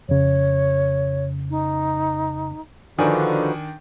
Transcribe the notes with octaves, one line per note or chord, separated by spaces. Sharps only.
F2 C#3 C#5
D#4
D3 D#3 F3 D4 D#4 F#4 B4 G#5